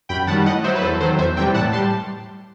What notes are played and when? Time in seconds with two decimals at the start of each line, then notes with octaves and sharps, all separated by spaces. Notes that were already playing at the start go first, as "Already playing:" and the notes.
0.09 F#2 G5 B5
0.27 D#3 F#5 A5
0.31 G3
0.45 A2 D#5 F#5
0.64 F#3 C5 E5
0.75 B4
0.82 E2 A4 C5
1.00 D#3 F#3 A4 C5
1.18 E2 C5 E5
1.37 C3 E3 G3 E5 G5
1.54 A2 F#5 A5
1.73 G3 A5 C6